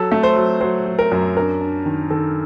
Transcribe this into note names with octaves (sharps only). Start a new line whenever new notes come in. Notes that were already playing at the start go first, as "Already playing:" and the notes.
Already playing: F#3 A4
A3
C5
F#3
F#3 C5
F#3
A#4
F#2
D4 A#4
D4
D#3
D#3 A4